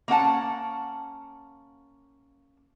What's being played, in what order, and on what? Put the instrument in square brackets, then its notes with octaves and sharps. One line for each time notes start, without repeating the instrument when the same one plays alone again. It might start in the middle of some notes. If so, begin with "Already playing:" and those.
[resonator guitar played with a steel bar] A#3 C#4 F#5 A5